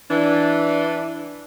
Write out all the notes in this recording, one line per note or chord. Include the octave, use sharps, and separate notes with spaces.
E3 D4